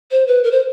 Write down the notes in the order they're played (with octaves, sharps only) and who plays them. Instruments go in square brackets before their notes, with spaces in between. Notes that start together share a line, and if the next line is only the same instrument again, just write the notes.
[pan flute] C5
B4
A#4
C5